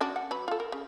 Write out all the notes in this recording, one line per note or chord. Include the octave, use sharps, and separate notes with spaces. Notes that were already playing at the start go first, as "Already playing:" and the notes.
C#4 D4 F#4
F#5
F#3 B4 B5
F4 A4
A#4
C#3